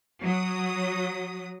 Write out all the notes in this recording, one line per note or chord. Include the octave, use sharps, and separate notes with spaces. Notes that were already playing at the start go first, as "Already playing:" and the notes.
F#3 D#6